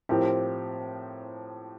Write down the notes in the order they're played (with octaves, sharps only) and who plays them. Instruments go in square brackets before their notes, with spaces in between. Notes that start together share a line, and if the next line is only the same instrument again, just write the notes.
[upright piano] A2 F3 C4 G4 A#4